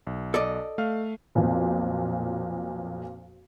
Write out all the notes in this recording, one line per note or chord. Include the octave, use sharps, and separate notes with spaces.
B1
A4 D5 D#5
A3 F5 F6
B1 F2 A#2